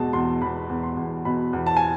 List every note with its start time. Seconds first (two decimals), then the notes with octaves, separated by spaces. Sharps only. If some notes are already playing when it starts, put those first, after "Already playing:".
Already playing: E2 B2 G#3 A5
0.13 E2 C6
0.41 E2 B5
0.69 E2
0.83 C6
0.97 E2
1.25 B2 B5
1.53 E2
1.66 A5
1.77 G#5